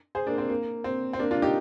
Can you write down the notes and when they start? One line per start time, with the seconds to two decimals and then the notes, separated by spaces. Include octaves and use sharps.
0.15 G#4 C5
0.27 A#3 D4
0.38 C4
0.49 A#3
0.84 C4
1.13 C4
1.19 A#3 D4
1.31 D4 F4
1.42 D#4 G4